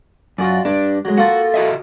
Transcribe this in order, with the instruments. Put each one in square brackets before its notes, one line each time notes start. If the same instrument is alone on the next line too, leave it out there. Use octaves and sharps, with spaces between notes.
[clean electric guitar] F#2 [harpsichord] F4 F#4 D5
[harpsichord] G2 [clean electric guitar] D4
[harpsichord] F#3 G#3
[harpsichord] A#3 F4 A4 [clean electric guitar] F#4
[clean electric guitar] F#4 D#5 E5